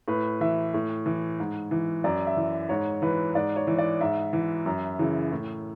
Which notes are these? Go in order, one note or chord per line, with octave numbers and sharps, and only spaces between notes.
A2 B4
E3 E5
A2
E3
G#2
E3
F#2 D5
E5
E3
G#2 C#5
E3 B4
G#2 D5
C#5
E3
D5
G#2 E5
E3
F#2
C#3 E3
A2